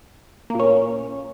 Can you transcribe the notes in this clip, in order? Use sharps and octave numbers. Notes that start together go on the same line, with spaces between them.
A#2 A#3 C#4